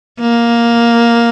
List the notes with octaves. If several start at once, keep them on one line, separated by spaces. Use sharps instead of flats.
A#3